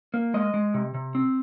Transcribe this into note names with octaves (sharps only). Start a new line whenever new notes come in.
A#3
G#3 D#5
G#3
C3
C3
C4